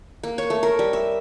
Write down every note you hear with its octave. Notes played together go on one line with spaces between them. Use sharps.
A#3
C#5
A3
A#4
G3
E5